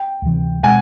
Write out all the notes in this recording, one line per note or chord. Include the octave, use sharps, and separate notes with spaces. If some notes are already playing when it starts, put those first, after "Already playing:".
Already playing: G5
D2 C3 E3
B2 G#3 F#5 G#5